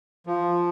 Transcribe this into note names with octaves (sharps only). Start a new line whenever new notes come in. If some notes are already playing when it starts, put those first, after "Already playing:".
F3